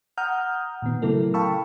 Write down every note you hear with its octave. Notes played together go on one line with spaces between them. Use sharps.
F#5 A#5 D#6 F6 G6
A#2 D#3 B3
C#3 F#3 A3 E4 A4 A#4
F5 G5 A5 B5 C#6 E6